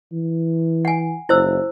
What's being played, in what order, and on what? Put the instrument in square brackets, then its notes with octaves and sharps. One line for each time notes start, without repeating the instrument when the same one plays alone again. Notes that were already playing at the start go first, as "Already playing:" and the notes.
[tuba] E3
[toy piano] F#5 G#5
[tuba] F#1 [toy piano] E4 C5 E6